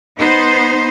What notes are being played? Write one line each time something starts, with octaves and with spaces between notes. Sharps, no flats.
B3 D#4 C5